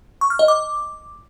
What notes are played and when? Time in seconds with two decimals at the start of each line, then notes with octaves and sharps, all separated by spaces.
0.21 C#6
0.30 F6
0.39 D#5
0.48 D6